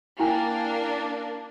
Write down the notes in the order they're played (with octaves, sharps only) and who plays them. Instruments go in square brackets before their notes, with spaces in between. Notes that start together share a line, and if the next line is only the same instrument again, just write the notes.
[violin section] A#3 D4 [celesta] E4 G5 G#5